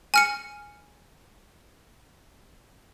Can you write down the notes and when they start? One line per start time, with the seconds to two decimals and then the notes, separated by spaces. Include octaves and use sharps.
0.14 G#5 F6 C#7